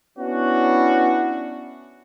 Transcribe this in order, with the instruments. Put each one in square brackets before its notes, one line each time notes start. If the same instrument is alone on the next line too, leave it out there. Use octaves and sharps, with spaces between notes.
[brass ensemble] B3 C#4 D4 E4 F#4